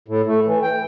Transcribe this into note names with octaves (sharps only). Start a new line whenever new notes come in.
A2
A3
E3
G5